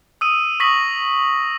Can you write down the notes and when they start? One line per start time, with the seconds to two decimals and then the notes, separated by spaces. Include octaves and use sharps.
0.21 D#6 E6 D#7
0.60 C#6 D#6 A#6 B6 D#7 F#7